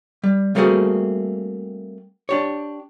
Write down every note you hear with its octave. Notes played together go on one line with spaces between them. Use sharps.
G3
G3 A3 A#3 C4 F#4 G#4
D4 G4 C#5